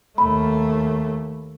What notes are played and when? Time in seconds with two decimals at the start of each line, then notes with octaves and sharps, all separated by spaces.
0.18 D#2 A3 B5